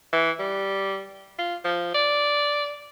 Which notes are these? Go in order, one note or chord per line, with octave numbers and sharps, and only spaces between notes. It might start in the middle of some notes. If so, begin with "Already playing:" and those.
E3
G3
F4
F3
D5